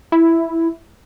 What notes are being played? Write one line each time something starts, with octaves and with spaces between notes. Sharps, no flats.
E4